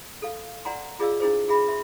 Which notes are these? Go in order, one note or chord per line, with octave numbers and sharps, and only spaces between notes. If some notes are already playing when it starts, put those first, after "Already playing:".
A4 F5
D5 F#5 G#5 A#5 C6
F4 G#4 D5 D#5 F5 E6
D4 E4 G#4 C5
F#4 G#4 E5 B5
E5 C6